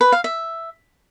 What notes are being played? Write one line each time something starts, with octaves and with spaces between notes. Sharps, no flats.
B4
F5
E5